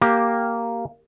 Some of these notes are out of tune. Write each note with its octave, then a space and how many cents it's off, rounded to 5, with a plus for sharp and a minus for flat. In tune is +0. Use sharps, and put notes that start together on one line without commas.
A#3 +0 G4 +0